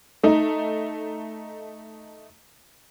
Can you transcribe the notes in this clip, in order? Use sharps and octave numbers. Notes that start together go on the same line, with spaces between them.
A3 D#4